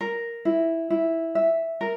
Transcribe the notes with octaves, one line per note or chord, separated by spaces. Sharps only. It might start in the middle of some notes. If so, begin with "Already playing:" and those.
A#4
E4
E4
E5
A#4